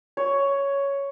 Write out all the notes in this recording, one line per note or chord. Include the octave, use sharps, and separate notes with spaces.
C#5